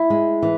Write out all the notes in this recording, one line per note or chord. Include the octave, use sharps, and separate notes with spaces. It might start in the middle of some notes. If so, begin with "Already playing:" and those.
Already playing: E4
G#3
E3